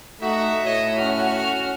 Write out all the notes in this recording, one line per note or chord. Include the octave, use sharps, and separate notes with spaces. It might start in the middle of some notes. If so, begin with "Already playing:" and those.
A3 D#4 F#4 E5
A2 C#5 D#5
C#4 F#4 F6